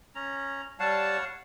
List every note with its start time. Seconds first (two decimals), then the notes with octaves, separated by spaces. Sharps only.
0.15 C#4 A#5
0.80 G3 C#5 F5 F#5 A5